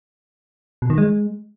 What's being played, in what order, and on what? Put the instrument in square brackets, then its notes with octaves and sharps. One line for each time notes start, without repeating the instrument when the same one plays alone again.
[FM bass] B2
D#3
G#3